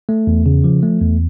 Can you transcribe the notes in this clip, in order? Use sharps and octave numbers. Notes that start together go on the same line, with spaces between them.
A3
E2
C#3
F3
A3
E2